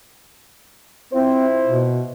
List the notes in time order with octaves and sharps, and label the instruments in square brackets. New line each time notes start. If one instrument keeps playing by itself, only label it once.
[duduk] C4 [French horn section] E4 F4 C5
[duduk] B2